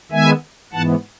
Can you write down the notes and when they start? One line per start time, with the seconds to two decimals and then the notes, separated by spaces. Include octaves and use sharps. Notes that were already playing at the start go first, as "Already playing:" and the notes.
0.12 D#3 G#3 B3 E5 G#5
0.73 G#2 E3 B3 F#5 A5